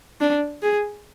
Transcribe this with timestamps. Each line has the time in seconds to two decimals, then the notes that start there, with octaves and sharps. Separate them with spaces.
0.21 D4
0.62 G#4